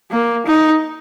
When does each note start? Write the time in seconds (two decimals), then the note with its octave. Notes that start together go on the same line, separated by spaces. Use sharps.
0.12 A#3
0.46 D#4